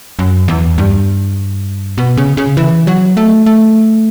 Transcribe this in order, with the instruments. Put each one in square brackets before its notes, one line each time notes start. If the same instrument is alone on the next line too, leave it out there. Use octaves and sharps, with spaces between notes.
[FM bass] F#2
E2
G2
B2
C#3
C#3
E3
F#3
A3
A3